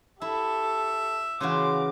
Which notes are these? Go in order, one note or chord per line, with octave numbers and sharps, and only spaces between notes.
E4 G4 A4 E5
C#3 E3 F#4 F5 C6 D6